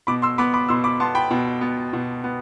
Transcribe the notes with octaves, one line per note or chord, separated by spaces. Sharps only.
B2 B5 D6
C6 E6
B3 B5 D6
B5 D6
B2 C6 E6
B5 D6
B3 A5 C6
G5 B5
B2
B3
B2
B3